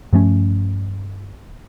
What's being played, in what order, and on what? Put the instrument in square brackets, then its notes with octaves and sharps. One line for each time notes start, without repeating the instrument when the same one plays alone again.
[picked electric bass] G2 F3 A3 C#4